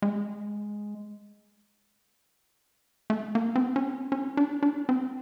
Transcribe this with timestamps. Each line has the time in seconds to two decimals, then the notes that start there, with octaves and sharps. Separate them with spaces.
0.02 G#3
3.10 A3
3.35 A#3
3.56 C4
3.61 B3
3.76 C#4
3.86 C4
4.12 C#4
4.37 D4
4.63 D4
4.89 C4